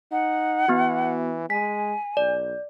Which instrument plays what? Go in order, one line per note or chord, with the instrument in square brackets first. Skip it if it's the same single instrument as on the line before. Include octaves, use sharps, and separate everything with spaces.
[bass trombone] D#4 [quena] F#5
[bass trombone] E3 [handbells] B3 F#4
[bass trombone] G#3 [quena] G#5 [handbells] B6
[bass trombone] B1 [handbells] D5